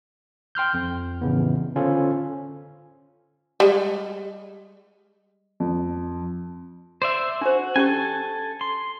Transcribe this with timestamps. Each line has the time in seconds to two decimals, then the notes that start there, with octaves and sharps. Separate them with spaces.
0.55 G5 C6 F6 G6
0.74 F2
1.21 A2 C#3 E3 B3
1.76 D3 C#4 F4 A4 C5
3.60 G3 G#3
5.60 F2
7.02 C5 D5 E5
7.41 D4 F#4 C5
7.76 C#4 G4 A4 G#5 C#6
8.61 C6